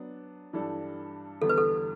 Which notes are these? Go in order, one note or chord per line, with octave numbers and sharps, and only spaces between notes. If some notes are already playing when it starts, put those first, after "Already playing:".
Already playing: F#3 B3 D4
G2 E3 G3 D4 A4
E2 D3 G3 B3 A4
B4
A4